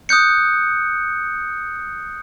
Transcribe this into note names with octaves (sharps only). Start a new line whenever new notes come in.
D#6 F#6 G6 C#7